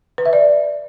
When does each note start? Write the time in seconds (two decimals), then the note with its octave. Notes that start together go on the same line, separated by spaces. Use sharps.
0.18 B4
0.26 E5
0.33 D5